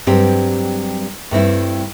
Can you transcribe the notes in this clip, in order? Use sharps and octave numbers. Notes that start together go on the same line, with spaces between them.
G2 F#3 C4 G4
G2 A3 C4 E4